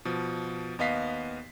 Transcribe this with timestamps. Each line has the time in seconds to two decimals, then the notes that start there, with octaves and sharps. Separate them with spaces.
0.05 B2 F3
0.79 D#2 B3 D#5 F5 B6 C7